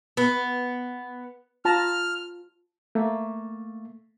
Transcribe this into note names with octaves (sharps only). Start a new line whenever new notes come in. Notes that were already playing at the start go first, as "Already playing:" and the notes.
B3
F4 A5 A#5 F6
A3 A#3